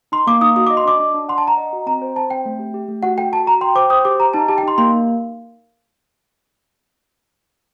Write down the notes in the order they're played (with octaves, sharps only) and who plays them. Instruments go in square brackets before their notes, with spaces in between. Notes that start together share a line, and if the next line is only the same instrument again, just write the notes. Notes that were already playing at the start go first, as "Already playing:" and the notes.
[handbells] D#4 [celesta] C6
[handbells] A#3 [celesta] D6
[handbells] D#4 [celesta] D#6
[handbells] F#4 [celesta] D#6
[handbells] D#5 [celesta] D6
[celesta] C6
[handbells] D4 [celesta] D6
[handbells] D4
D4
[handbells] F#5 [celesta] C6
[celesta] A5
[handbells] F#5 [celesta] A#5
[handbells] D#5
F#4
[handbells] C4 [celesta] A#5
[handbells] C5
[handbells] C5 [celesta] A5
[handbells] C4 [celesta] G5
[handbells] A3
G4
G4
A3
[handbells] F#4 [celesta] F#5
[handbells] A4 [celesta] G5
[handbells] F#4 [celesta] A5
[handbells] F#4 [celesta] A#5
[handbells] G5 [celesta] C6
[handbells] C5 [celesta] D6
[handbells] C5 [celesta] D#6
[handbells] G4 [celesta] D6
[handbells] G4 [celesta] A#5
[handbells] D#4 [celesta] A5
[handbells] G4 [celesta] A5
[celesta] G5
[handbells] D#4 [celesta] C6
[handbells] A#3 [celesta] C6